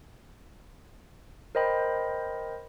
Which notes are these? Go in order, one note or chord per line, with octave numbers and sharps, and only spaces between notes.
A#4 C5 D#5 G5 B5